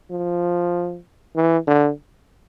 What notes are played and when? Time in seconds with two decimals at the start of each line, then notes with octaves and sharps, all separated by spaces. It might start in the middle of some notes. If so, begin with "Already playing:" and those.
0.11 F3
1.36 E3
1.67 D3